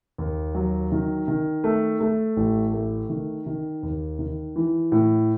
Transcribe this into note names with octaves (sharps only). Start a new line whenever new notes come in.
D#2
F#3
D#3
D#3
A3
A3
A1
A3
D#3
D#3
D#2
D#3
E3
A2